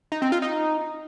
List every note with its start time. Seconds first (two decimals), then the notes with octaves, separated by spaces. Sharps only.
0.12 D#4
0.22 C4
0.32 F4
0.42 D#4